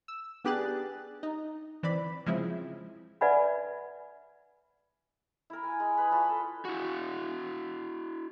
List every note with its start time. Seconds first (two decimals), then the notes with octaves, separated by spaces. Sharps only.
0.08 E6
0.44 B3 D4 G4 G#4 F#6 A6
1.23 D#4
1.83 E3 C4 D5 B5
2.26 C#3 F3 G#3 C4 E4
3.21 B4 D5 E5 F#5 G#5 B5
5.50 E4 A#4
5.63 G#5
5.80 G#3
5.97 G#4 B4
6.11 F4 C#5 A5 B5
6.29 A4
6.65 E4 F#4